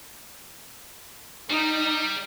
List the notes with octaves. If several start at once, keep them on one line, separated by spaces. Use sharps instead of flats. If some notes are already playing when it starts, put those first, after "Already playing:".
G3 D#4